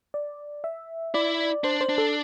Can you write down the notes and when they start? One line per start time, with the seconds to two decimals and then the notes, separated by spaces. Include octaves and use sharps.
0.14 D5
0.64 E5
1.14 E4 D5
1.64 D4 C5
1.81 C5
1.89 D4
1.98 A4